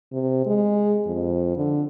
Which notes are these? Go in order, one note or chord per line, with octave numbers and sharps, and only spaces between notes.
C3
G#3
F2
D3